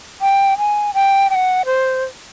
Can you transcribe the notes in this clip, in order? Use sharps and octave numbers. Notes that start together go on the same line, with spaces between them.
G5
G#5
G5
G5
F#5
C5